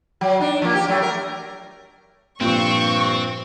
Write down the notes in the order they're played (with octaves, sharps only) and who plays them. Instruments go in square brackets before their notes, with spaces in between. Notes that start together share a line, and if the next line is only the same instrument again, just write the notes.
[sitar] F#3
D4 D#4
F3 A#3
G4
F#3 A3
A#4
[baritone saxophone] G2 [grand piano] A#2 F3 F4 [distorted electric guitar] C4 [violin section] C#6